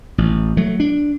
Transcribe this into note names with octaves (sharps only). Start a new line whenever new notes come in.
A1
F#3 A3
D4